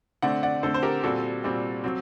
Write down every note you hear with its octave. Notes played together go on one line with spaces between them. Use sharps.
D3 A3 C4 D5 F#5
D5 F#5
D3 A3 C4 A4 C5
C5
G4 A#4
A#2 G3 C4 F#4 A4
A#2 G3 C4
F#3 C4